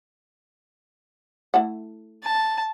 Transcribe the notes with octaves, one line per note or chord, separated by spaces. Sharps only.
A3 E4 F#5
A5